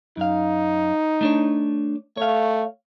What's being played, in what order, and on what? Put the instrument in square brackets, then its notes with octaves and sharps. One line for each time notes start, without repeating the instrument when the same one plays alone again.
[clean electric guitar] F#2 F5 [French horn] D#4
[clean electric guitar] A3 D4 C#5
[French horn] A3 [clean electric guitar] C#5 F5